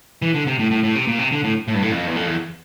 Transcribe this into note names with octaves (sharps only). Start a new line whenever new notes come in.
E3
D3
C3
A2
A2
A2
C3
A#2
C3
D3
A2
A2
G2
A2
F2
E2
F2
E2